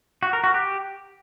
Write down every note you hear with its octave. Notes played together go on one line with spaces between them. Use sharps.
F#4
A#4
F#4
G4